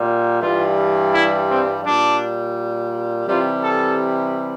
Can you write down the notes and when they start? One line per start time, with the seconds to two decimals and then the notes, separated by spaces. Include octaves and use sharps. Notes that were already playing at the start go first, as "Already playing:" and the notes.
Already playing: A#2 G3
0.40 G2 E3 G3 F4
1.11 E4
1.48 C4
1.83 A#2 G3 D4
3.26 C3 E3 G3 F4
3.62 A4